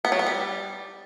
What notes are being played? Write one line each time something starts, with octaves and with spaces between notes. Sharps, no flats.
B3
F#3
B3
G3